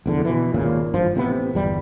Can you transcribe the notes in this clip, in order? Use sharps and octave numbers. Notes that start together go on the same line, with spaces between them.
F1 E2 D3
B2 E3
G#1 D#2 A#2 C#3
G#1 G2 F3
A1 C3 E3 B3
G1 E2 G3